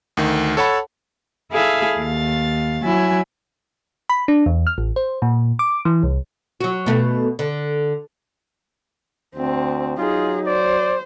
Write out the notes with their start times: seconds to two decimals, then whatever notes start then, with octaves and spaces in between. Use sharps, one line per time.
0.17 D2 D#3
0.57 A4 C#5 F#5 A5 B5
1.52 E4 G#4 A4 E5 F5
1.98 D#2 F5 A6
2.83 F#3 E4 G#5
4.09 B5
4.28 D4
4.46 E2
4.67 F6
4.78 A1
4.96 C5
5.22 A#2
5.59 D6
5.85 E3
6.03 C2
6.61 F#3 F#4
6.86 B2 A3
7.39 D3
9.36 D2 C4
9.98 F#3 D#4 F4 G#4
10.47 C5 D5